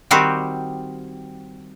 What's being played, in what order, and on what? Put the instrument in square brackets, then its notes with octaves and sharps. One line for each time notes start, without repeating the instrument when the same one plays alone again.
[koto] D#3 G3 C4 F#4 G4